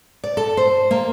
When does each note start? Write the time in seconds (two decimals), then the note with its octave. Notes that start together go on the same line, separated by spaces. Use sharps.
0.24 D5
0.37 A4
0.57 C5
0.91 A#3